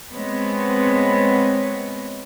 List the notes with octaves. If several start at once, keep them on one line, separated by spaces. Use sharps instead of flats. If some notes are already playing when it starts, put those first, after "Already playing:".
G#3 B3 C4 C#5